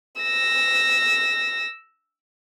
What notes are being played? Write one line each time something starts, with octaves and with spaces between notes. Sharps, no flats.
E6 A#6